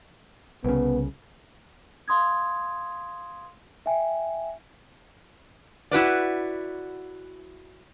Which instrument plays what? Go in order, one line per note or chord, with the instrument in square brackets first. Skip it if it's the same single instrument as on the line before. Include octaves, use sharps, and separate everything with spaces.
[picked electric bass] C2 C#3 [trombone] B3
[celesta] F5 C6 D#6 G#6
E5 G5 G#5
[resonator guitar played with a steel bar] E4 F#4 B4 D5